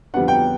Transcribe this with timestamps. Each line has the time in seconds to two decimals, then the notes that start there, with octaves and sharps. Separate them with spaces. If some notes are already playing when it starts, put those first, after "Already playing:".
0.14 F2 D3 G3 B3 D4 F#5
0.28 G5